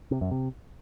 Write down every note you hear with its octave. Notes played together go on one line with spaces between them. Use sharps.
C3
F#2
C3